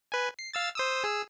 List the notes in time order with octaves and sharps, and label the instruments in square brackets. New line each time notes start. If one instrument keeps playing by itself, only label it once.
[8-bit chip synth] B4 G#5
C7
F5 E6 A6
C5 D#6 E6
G#4 E6